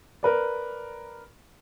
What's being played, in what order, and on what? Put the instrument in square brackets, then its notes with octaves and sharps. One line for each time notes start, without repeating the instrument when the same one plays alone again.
[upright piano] A#4 B4 D5